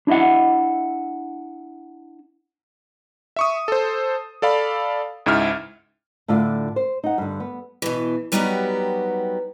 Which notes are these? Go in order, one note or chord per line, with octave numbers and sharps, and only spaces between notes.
D4 E4 D#5 E5 F#5
E5 C#6 D#6
A4 C5
A4 D5 F5 B5
C#2 G#2 E4 E5 F6
A2 D3 D4 F4 F5
C5
D#4 F#5
G2 D3
B3
B2 E3
F#3 G3 B3 D#4 F#4 G4